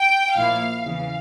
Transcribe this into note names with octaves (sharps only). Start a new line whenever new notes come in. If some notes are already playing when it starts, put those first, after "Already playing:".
Already playing: G5
A#1 A#2 F3 A#3 E4 F5
E2 C#3 E3 F5